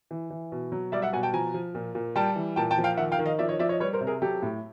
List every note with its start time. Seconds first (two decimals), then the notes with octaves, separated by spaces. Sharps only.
0.11 E3
0.30 E3
0.52 B2
0.72 F#3
0.92 G3 D5 E5
1.02 E5 F#5
1.13 B2 F#5 G#5
1.23 G5 A5
1.33 F3 G#5 A#5
1.54 F3
1.75 A#2
1.95 A#2
2.16 G3 G5 A5
2.36 E3
2.56 A#2 G5 A5
2.71 G5 A5
2.78 F3
2.84 F5 G5
2.97 D#3 E5 F#5
3.12 F5 G5
3.19 D#3
3.26 D#5 F5
3.39 F3 D5 E5
3.49 C#5 D#5
3.59 F3 D5 E5
3.69 C#5 D#5
3.80 G3 B4 C#5
3.93 A#4 C5
4.01 C3
4.07 G#4 A#4
4.22 F#3 G4 A4
4.42 A2